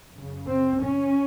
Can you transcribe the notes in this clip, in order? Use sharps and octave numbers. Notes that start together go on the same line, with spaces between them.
F#2 C#3
C4
C#4